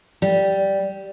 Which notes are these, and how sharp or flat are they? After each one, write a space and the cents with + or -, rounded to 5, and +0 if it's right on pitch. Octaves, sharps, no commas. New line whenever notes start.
G3 -5